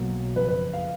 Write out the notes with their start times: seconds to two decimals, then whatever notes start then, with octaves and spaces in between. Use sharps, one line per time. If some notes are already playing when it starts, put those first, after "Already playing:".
Already playing: B1 B2 F#3 A#3
0.36 F#1 F2 F3 B4
0.49 B4
0.73 F5